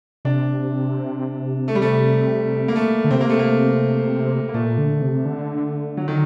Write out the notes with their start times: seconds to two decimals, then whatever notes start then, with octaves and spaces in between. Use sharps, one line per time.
0.25 C3 D4
1.68 A3
1.75 G3
1.82 A3
2.68 A#3
2.76 A3
3.04 D3
3.11 C3 C4
3.21 A#3
3.30 A3
3.39 A#3
4.49 A#3
4.54 A#2 A3
4.78 D3
5.02 C3
5.25 D3
5.97 F#3
6.08 D#3